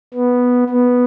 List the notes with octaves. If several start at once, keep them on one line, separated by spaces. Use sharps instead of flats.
B3
B3